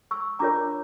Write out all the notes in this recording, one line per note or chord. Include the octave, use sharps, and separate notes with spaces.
C#6 E6
D4 F4 A#4 C#5 A#5 D6